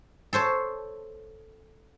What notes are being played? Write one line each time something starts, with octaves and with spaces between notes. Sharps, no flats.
A4 C5 C#5 A5